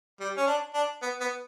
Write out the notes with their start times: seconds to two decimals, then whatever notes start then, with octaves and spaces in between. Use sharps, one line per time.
0.20 G3
0.37 C#4
0.47 D4
0.74 D4
1.02 B3
1.20 B3